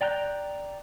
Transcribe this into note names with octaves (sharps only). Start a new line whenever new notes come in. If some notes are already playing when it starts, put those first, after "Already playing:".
D5 G5 A#5 F#6 G6